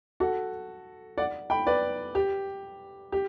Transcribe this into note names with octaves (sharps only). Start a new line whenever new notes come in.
F#4 A4
D5 F#5
G5 B5
B4 D5
G4
G4